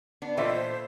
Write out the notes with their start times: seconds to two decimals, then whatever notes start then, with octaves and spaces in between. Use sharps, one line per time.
0.22 B3 D4
0.37 A#2 E3 F4 A4 C5 D#5 E5